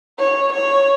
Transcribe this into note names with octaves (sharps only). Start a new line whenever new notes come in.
C#5
C#5